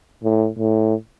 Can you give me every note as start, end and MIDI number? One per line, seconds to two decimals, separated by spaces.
0.23 0.48 45
0.58 0.94 45